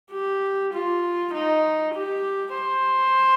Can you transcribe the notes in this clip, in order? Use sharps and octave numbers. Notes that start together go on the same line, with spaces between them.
G4
F4
D#4
G4
C5